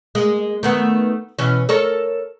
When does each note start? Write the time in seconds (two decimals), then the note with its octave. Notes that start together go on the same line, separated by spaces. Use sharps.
0.15 G#3 A#3
0.63 D#3 A3 B3
1.39 B2 E3 C#4
1.69 A4 A#4 C#5